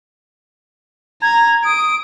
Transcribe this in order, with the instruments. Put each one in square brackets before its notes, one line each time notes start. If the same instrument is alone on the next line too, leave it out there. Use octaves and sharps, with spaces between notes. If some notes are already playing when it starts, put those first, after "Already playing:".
[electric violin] A#5 [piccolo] G#6
[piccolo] D#6 [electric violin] D7